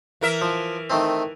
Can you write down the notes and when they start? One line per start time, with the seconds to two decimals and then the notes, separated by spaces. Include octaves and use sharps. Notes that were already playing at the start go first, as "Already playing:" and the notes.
0.21 E3 A#4 E5
0.42 F3
0.90 D#3 A3 C4